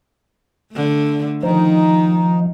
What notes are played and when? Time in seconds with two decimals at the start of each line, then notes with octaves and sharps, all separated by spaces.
0.72 D3 A3
1.43 D#3 F3 D#4